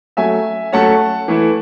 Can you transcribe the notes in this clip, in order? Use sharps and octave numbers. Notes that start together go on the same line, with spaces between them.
F#3 A3 C#4 E5 G#5
F#3 A3 C#4 F#5 A5
E3 A3 E4